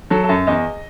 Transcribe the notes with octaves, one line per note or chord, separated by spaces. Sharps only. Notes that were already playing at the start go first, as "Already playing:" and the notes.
F#3 A4
A4
F#2
E2 D#5